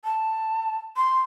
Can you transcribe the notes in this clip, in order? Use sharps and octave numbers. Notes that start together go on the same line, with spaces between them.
A5
C6